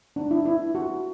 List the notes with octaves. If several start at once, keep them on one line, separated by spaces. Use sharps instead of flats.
D4
E4
E4
F#4